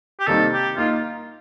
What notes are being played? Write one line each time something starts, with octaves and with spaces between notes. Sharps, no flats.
G4
C3 D#3 G3 A#3 D#4 A4
G4
A#3 D#4 F4